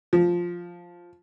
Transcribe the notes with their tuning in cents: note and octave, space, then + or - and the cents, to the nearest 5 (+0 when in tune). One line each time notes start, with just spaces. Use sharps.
F3 +5